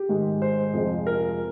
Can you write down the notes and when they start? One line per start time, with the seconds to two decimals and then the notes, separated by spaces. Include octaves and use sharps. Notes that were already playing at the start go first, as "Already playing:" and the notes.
Already playing: G4
0.09 G#2 D#3 G#3
0.42 C5
0.73 F2 C3 F3 G#3
1.07 A#4